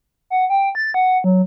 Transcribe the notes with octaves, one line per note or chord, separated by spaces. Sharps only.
F#5
G5
A6
F#5
F#3